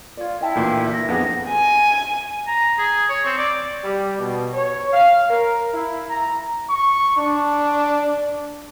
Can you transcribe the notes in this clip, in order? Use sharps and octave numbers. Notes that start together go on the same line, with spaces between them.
F4 C#5 D5
E4 D#5 G5 A5
D2 A#2 E3
A#6
F2 B3 D4 G#4 F#5
G#5
A#5
G#4
C#5
C4
D5
G3
B2
C#5
F5
A#4
E4
A#5
C#6
D4